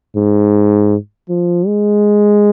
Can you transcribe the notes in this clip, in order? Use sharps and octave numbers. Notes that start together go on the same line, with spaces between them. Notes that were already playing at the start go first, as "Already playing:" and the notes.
G#2
F3
G#3